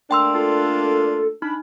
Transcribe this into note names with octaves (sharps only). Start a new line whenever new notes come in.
A3 A#3 D4 G5 C6 E6
F4 A4
D4 D#4 B5